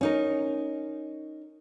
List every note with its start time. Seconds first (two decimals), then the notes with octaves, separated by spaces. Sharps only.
0.01 C#4 D#4 A#4